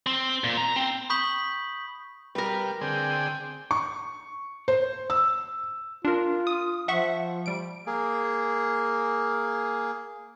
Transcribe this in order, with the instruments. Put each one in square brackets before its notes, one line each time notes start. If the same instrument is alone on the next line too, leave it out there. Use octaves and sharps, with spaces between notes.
[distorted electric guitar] C4
A#2
A#5
C4
[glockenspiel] B5 C#6 D#6 G6 B6 F#7
[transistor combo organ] G3 [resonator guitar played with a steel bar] A#4 B4
[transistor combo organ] D3 C4 G#4 [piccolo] G5
[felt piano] C#6
C5
E6
[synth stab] D4 A#4 [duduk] F4
[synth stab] D#6
[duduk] F3 [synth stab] E5 F#5 C#6
[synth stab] G3 D7
[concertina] A#3 G#4